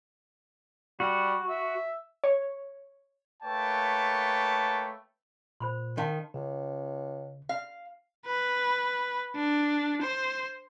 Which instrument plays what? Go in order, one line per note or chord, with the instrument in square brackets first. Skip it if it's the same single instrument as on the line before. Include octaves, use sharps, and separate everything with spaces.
[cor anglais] G3 [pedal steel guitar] F#4
[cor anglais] E5
[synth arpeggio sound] C#5
[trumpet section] A3 A#3 B4 C#5 G5 A5
[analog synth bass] A#2 [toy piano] C5 B5 C6
[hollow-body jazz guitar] D#3 [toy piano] F5 A5 C6
[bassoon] C#2 [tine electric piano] C#3
[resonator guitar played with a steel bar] F5
[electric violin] B4
D4
C5